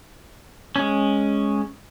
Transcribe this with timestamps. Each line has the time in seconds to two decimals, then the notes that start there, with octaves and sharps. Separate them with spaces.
0.76 G#3 C#4